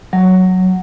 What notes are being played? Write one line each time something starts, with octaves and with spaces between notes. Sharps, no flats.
F#3